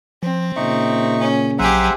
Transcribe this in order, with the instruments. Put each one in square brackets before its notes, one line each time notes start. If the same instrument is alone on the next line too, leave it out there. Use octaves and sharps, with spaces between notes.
[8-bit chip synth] F3 [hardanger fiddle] C4
[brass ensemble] A#2 C#3 [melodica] D#4 C#6 [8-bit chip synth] E5
[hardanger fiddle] C#4
[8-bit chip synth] A#1 F#3 A#5 [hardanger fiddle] G4 G#4 [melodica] C5 E5 F#5